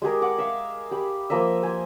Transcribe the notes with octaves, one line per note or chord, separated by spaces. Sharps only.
G#3 G4 G#4 A#4
F#5 D6
E5 F5
G4 B5
F3 A#3 D#5 E5
C5 G#5